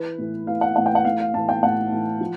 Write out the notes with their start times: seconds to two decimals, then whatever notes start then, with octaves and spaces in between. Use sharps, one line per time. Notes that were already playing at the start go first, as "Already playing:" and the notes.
Already playing: E3 B4
0.18 A2 E3
0.47 A2 E3 F5
0.61 F#5
0.76 A2 E3 F#5
0.86 G5
0.95 F#5
1.05 A2 E3 F5
1.20 F5
1.33 A2 E3 A5
1.49 G5
1.63 A2 E3 F#5
1.92 A2 E3
2.21 F3